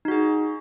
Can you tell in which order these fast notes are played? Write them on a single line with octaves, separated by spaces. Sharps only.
D#4 F#4 G#4